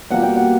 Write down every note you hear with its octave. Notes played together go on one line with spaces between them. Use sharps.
B2 G3 A#3 F#5
G5
F#5